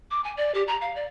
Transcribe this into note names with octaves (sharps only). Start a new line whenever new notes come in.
D6
G#5
D5
G4
A#5
F5
D5